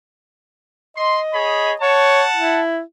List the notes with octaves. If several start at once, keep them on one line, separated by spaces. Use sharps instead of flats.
D#5 C6
G#4 C#5 B5
C#5 F#5 A5
E4